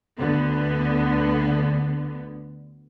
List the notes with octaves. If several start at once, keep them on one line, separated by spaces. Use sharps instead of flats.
D2 D3 B3